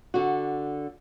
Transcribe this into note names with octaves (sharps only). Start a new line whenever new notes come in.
D3 F#4